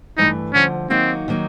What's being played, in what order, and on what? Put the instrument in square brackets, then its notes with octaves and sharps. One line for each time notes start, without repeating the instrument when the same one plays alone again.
[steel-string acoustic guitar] G2 E3 A3 [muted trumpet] D#4
[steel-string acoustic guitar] D2 D3 F3 [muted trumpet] C#4
[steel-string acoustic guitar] D#3 F#3 A#3 D#4 F#4 [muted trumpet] C4
[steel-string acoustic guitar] D#3 F#3 A#3 D#4